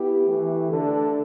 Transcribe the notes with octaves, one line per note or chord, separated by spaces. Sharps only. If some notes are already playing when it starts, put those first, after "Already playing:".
Already playing: B3 E4 G4
E3 A3 G4
D3 A3 D4 A4